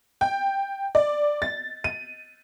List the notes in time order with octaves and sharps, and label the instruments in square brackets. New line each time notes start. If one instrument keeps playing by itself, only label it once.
[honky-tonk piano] G5
D5
A6
D#7